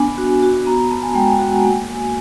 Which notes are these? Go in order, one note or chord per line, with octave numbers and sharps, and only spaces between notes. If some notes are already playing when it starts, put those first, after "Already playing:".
Already playing: B3 D4 G#5
F#4
F#4
B3 A#5
B3 A5
G#5
G#3 G5
G#5
F#4 F#5
G#5
A#3